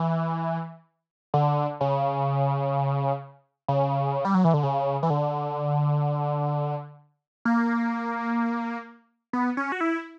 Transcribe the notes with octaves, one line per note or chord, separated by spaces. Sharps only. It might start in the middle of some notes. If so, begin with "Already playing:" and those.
Already playing: E3
D3
C#3
C#3
G3
F#3
E3
D3
C#3
E3
D3
A#3
B3
C#4
F#4
E4